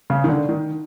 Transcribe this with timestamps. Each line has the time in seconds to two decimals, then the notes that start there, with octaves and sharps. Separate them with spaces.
0.10 C#3
0.24 D#3
0.28 D3
0.49 D#3